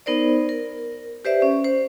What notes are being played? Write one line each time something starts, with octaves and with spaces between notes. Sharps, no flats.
B3 D#4 A#4 C5 D5
A#4
G4 B4 C5 D5 E5
C#4
C5